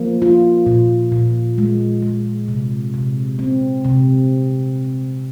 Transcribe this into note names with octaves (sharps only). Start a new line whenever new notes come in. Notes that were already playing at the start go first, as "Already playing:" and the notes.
Already playing: F3 A#3
F4
A#2
A#2
G#3
G#3
C3
C3
C4
C3